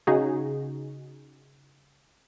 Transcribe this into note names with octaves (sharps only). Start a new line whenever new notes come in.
C#3 D#4 F#4 G#4